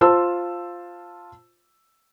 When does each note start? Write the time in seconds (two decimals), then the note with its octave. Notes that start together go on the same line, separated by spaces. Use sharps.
0.01 F4 C5 A5 E6